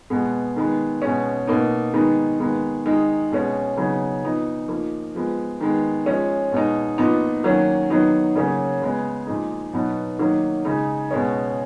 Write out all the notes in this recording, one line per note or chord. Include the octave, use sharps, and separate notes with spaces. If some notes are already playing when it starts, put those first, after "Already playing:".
B2 G#3 B3
D#3 G#3 B3
B2 G#3 C#4
B2 A#3 D#4
D#3 G#3 B3 D#4
D#3 G#3 B3
D#3 G#3 D#4
B2 G#3 C#4
C#3 F#3 B3 D#4
F3 B3 D#4
F3 A#3 D#4
F3 G#3 B3
D#3 G#3 B3
F3 G#3 C#4
B2 G#3 D#4
A#2 F3 B3 D#4
D#3 F#3 A#3 C#4
D#3 F#3 B3 D#4
C#3 F#3 A#3 C#4
C#3 G#3 B3
A#2 F3 G#3 D#4
B2 F#3 B3 D#4
D#3 F#3 A#3 D#4
C#3 G#3 D#4
B2 G#3 C#4